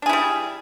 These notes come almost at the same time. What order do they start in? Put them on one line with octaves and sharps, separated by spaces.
D4 G#4 E4 G3